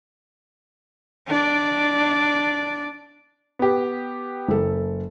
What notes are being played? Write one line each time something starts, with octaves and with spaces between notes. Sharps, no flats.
D4 D5
B3 G4
F#1 A4